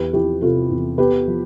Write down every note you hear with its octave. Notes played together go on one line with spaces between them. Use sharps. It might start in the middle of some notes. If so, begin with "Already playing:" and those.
Already playing: E2 G4 B4
F3 E4 G4
C3 F4 A4
E2
B3 G4 B4
F3